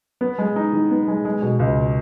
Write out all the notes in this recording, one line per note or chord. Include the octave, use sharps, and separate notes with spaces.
B3
G#3
D#4
D#3
B3
G#3
G#3
B2
C#2